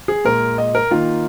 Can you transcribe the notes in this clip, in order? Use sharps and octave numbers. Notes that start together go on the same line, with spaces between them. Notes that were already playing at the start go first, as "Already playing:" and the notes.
G#4
A#2 G#3 A#4
D#5
A#4
D#3 A#3 F4